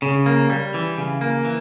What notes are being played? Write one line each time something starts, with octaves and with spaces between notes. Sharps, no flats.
C#3
A#3
G3
E3
C#3
A#3
E3